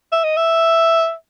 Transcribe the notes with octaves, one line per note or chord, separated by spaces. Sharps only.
E5
D#5
E5